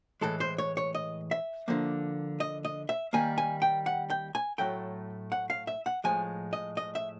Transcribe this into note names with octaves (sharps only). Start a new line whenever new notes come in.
A2 E3 G#3 A4
C5
C#5
C#5
D#5
E5
D3 F3 A#3
D#5
D#5
E5
D#3 G3 A#3 G#5
G#5
G5
F#5
G5
G#5
A2 F#3 A3 G5
F#5
F5
E5
F#5
A2 F3 G#3 G#5
D#5
D#5
E5